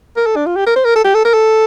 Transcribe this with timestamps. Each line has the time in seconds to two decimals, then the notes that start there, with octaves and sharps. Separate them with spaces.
0.17 A#4
0.26 A4
0.36 D4
0.46 F4
0.56 G4
0.66 A#4
0.76 C5
0.85 A#4
0.95 A4
1.04 G4
1.15 A4
1.25 A#4
1.34 A4